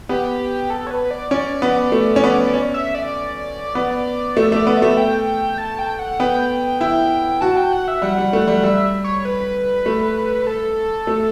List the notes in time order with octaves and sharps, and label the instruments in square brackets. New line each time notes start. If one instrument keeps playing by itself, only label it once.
[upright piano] B3 [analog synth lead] G4
[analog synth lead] A4
C#5
B4
D5
[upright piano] C#4 [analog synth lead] D5
[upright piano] B3
A3
C#4
B3
C#4
[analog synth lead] E5
D5
[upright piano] B3
[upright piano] A3 [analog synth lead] E5
[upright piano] A3 [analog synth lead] D5
[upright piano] B3
[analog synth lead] E5
[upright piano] A3
[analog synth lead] G5
A5
G5
F#5
[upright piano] B3 [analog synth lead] G5
[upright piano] E4 [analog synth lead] G5
[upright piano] F#4 [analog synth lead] A5
[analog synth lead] G5
F#5
E5
[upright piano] G3 [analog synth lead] F#5
[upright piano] G3
A3
G3
[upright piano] G3 [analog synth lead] E5
[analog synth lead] C#5
B4
[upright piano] A3
[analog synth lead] A4
[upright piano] A3